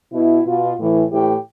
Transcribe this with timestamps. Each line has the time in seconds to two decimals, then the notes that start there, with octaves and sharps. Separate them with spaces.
0.13 B2 E4
0.46 B2 F4
0.78 A2 E3
1.10 A2 E3 G4